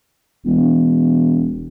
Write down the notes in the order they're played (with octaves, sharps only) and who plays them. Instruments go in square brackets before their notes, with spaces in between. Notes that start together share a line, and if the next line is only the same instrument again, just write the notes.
[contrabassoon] E1